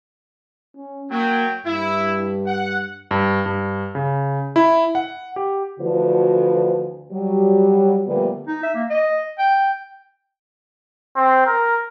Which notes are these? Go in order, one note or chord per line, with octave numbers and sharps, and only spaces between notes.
C#4
F#3 A#3 G5
G2 E4
F#5
G2
G2
C#3
E4
F#5
G4
D2 D3 E3 F3 F#4 B4
F#3 G3
A#2 D3 F3 G3 A3 B3
D#4
E5
A#3
D#5
G5
C4
A#4